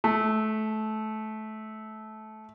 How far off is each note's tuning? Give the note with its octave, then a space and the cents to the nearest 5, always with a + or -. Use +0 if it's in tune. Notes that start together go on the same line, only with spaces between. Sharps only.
A3 -20